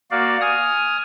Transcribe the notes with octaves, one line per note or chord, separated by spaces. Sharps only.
A#3 F#4 D5 F5
G#5 D#6 F6